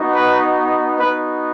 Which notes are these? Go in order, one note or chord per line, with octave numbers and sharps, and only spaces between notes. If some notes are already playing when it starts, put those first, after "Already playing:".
Already playing: B3 D#4 F#4
B4
B3 D#4 F#4 B4